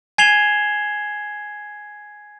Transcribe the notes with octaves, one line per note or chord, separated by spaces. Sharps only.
G#5 G#6 C7 E7 F7 G7